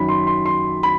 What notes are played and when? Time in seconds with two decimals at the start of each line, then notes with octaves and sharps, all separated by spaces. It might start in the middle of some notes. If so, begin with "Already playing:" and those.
Already playing: F#2 D#3 F#3 B5
0.09 C6
0.27 C6
0.46 C6
0.83 B5